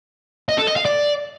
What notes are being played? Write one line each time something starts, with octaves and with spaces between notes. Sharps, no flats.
D#5
A4
D#5
F5
D5